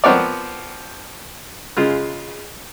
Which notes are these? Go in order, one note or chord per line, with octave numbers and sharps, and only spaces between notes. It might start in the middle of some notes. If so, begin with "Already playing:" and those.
F3 B3 C4 A#4 C#5 D5
C#3 G#3 F4